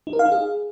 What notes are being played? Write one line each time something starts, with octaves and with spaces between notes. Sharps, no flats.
D#4
A#4
F5
D#4
G#4